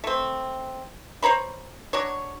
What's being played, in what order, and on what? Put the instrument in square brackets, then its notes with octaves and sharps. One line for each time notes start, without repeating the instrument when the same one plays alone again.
[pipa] A3 C4
C5 C#5 A#5 B5
F#3 D4 C#5